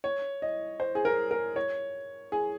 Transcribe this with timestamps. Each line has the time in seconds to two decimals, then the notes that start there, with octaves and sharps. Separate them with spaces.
0.04 C#5
0.42 D#5
0.80 C5
0.95 G#4
1.05 A#4
1.31 A#4
1.56 C#5
2.32 G#4